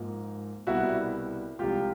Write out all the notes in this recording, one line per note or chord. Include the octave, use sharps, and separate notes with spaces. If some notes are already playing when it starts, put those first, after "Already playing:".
Already playing: G#2 F3 A#3
C2 B2 G3 E4 F#4
C2 C3 F3 G#3 F4 G4